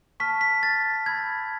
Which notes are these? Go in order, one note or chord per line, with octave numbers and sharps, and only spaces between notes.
A5 C#6 F6 B6
B6
A6
B5 E6 G6 G#6